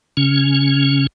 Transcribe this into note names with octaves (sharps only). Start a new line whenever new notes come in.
C#3 C#4